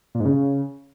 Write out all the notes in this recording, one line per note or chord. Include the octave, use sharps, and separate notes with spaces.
A#2
G#2
C#3